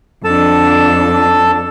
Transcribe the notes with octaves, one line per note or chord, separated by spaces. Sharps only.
F2 D4 A4 A5